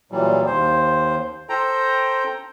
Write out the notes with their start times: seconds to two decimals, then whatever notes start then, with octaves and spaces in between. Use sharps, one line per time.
0.11 A#2 E3 F#3 G3
0.46 D#2 C5
1.49 A4 C5 G5 A#5